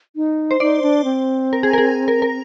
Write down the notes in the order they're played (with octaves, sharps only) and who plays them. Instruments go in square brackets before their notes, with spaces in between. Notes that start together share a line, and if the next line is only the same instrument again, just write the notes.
[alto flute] D#4
[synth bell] C5
[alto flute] D#4 [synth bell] D5
[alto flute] D4
C4
[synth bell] A#4
G#4
A#4
G#4
A#4
A#4